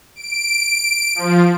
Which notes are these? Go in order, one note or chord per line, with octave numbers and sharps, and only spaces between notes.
D7
F3